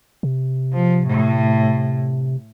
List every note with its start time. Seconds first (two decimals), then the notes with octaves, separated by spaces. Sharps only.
0.23 C3
0.73 F3
1.06 A2